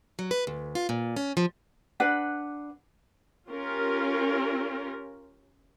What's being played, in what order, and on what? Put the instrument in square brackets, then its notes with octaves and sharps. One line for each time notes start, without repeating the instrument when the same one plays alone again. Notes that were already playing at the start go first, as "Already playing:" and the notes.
[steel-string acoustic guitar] F#3
B4
D2
F4
A#2
C#4
F3
[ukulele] D4 B4 F#5
[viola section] C#4 F4 G4 A#4